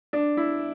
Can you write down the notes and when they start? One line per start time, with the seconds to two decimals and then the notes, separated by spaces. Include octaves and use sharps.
0.13 D4
0.37 E4